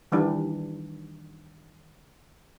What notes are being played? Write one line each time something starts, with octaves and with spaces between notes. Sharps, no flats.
D#3 E3 G3 D4